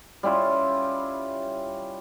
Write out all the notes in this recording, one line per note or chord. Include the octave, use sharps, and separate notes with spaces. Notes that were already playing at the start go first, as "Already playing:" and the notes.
G3 C#4 E4 F4